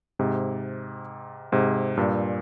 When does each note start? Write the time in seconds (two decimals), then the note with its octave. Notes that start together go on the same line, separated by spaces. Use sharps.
0.19 G#2 C3
1.52 G#2 C3
1.97 G2 A#2